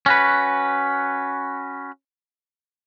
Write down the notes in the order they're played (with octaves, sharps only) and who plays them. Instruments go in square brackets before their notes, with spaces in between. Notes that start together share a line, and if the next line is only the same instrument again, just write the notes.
[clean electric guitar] C#4 F#4 B4